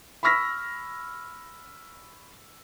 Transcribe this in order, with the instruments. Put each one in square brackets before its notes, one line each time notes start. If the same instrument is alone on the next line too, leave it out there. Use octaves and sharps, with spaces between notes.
[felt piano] B5 C#6 E6 F6 A#6 B6